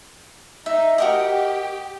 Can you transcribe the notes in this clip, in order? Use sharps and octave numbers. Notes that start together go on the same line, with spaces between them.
D#4 E5
F#4 G4 A#4 D#5